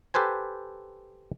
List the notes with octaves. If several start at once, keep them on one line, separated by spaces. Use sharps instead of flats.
G4 A4 B4 C5 G#5